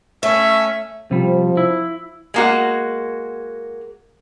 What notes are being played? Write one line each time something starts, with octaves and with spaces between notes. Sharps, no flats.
A3 C#4 E5
C3 F3 G3
E4
G#3 A#3 F#4